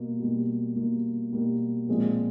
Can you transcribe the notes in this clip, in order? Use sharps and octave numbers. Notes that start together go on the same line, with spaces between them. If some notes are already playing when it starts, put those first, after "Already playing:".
Already playing: B2 G3 A#3
B2 G3 A#3
B2 G3 A#3
B2 G3 A#3
A#2 F3 G#3 C4